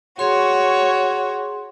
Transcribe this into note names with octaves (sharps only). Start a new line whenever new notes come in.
F#4 G#4 C#5 C6